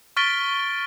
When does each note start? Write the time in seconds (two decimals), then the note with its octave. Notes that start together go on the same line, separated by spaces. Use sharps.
0.17 C#6 F6 A6 B6 D7 G7